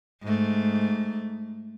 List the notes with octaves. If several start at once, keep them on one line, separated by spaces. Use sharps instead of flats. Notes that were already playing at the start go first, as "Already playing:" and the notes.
G#2 A3